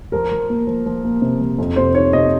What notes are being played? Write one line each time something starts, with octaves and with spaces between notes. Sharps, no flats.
F3 A#4
F3
A#3
F3
F3
A#3
C3
F3
F2
C3 C5
D#3 C#5
C3 D#5